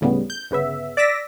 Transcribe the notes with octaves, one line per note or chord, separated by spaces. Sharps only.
D2 A2 C#3 G3 B3
G6
G1 C#3 B3 E5
D5 D6 E6 A#6 B6